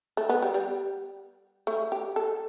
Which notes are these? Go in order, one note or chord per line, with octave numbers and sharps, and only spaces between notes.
A3
B3
G3
G3
A3
G4
A4